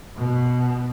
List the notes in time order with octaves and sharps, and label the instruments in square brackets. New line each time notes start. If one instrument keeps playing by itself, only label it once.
[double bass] B2